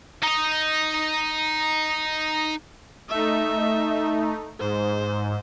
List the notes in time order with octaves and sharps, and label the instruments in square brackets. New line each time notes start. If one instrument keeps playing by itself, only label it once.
[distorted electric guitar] D#4 D#5
[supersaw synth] A3 D#4 [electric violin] E5
[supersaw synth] G#2 [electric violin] C5